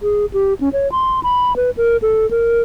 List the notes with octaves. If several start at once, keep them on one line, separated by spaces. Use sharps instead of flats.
G#4
G4
C#4
C#5
C6
B5
B4
A#4
A4
A#4